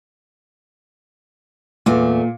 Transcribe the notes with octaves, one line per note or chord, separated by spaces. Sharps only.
E2 A#2 A3